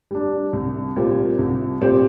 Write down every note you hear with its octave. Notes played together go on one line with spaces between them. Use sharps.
G3 D4
C2
A#2 G3 C4 G4
C2
A#2 G3 C4 G4